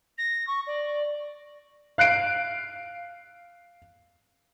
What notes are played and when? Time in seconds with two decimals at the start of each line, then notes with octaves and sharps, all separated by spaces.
0.18 A#6
0.47 C#6
0.67 D5
1.98 F5 F#6 C7 D7